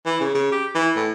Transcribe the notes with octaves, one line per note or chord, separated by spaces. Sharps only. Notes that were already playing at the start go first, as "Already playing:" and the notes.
E3
C#3
C#3
G4
E3
A2